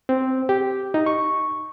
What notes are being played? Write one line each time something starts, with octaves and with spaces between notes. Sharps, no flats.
C4
G4
D#4
C#6